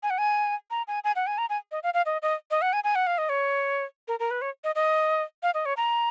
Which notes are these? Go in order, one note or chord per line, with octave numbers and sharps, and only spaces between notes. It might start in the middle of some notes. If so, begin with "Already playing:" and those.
G#5
F#5
G#5
A#5
G#5
G#5
F#5
G#5
A#5
G#5
D#5
F5
F5
D#5
D#5
D#5
F#5
G#5
G#5
F#5
F5
D#5
C#5
A#4
A#4
B4
C#5
D#5
D#5
F5
D#5
C#5
A#5